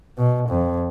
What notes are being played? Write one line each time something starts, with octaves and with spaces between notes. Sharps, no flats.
B2
F2